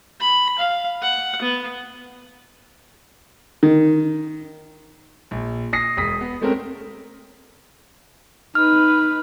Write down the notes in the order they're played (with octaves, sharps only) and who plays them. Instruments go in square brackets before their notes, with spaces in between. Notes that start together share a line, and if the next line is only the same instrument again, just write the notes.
[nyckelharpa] B5
F5
F#5
B3
[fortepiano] D#3
[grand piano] A#1
D#6 A#6 C7
E1 D#6 B6
B3
G#3 A3 C4 C#4 A#4
[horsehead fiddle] D#4 B4 [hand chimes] F6